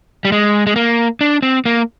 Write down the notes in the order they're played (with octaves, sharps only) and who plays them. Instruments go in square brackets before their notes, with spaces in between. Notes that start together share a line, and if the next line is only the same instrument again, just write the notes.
[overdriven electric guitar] G3
G#3
G#3
A#3
D4
C4
A#3